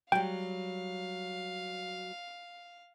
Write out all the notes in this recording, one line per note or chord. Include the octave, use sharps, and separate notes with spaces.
F#3 G3 F5 G5